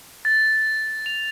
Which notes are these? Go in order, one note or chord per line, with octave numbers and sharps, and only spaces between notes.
A6
F7